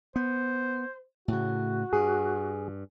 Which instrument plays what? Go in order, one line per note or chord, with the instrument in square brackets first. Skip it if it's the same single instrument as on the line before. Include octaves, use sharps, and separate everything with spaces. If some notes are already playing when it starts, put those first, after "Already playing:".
[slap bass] B3 [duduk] C5
[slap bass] A2 C#3 [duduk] F#4
[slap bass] G2 [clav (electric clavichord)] G#4